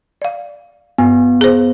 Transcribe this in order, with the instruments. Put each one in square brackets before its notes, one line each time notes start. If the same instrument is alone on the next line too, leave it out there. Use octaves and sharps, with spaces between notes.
[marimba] D5 F5
[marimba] G2 [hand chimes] B3
[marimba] G#4 C5